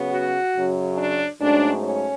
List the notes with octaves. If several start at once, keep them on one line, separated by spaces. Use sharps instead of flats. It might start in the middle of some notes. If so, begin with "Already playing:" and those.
Already playing: C#3 F#3 B3
F#4
F#2 C#3 F#3
D4
G#2 F#3 A3 C#4 D4
C#4